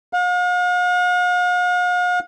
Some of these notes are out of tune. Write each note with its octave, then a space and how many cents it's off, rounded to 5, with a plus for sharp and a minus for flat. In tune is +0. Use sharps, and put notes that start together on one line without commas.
F5 +45